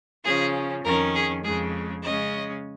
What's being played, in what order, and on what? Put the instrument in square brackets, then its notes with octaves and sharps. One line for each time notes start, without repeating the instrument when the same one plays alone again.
[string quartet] C#3 F3 C#4 G#4
F2 D#3 C#4 A#4
G#4
F2 C#3 G#3 G#4
C#3 G#3 C#4 D#5